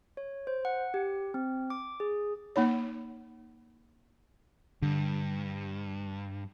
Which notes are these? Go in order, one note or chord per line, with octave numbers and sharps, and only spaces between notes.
C#5
C5
F#5
G4
C4
D6
G#4
A#3 D#4 C#5
G2 D3